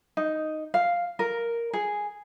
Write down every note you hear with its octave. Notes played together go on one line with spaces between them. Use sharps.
D#4
F5
A#4
G#4